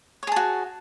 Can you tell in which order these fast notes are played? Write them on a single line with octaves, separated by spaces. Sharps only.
C#5 G#4 A5 F#4